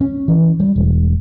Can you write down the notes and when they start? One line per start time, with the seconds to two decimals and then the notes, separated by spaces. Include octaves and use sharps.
0.01 C#4
0.28 E3
0.60 G3
0.76 E1